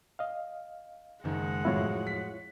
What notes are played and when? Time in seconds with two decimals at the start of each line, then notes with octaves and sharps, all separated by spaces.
0.19 D#5 F5
1.24 F#1 D#3 G#3 F#5
1.65 F2 A2 F#3 E4 F4 C#5
2.07 B6